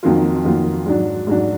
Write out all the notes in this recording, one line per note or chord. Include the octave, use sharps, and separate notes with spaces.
F2 D#3 F#3 A#3 F4
F2 D#3 F#3 A#3 F4
G#2 F#3 D4
G#2 F#3 D4